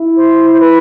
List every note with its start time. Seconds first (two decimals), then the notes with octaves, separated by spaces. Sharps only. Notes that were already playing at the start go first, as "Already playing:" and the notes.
Already playing: E4
0.16 C5
0.53 C5
0.60 B4